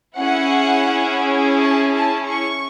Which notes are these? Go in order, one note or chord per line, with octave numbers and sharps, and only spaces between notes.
C#4 E4 G#4 F#5
A5
A5
C#6